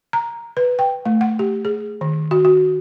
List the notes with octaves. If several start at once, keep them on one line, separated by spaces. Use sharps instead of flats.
A#5
B4
G5
A3
F#5
G4
G#4
D#3
F#4
F#4